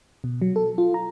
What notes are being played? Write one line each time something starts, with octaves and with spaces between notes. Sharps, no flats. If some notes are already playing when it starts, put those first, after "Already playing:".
B2
F#3
A4
F4
A#5